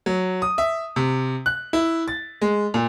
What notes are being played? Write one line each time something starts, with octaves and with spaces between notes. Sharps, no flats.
F#3
D#6
E5
C3
F#6
E4
A6
G#3
A#2